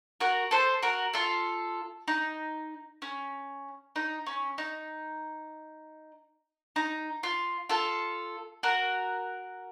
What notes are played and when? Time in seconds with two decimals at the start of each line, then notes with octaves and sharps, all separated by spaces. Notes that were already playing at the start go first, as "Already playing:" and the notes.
0.20 F#4 A#4
0.51 A4 C5
0.82 F#4 A#4
1.13 F4 A4
2.08 D#4
3.02 C#4
3.96 D#4
4.26 C#4
4.58 D#4
6.76 D#4
7.23 F4
7.69 F4 A4
8.63 F#4 A#4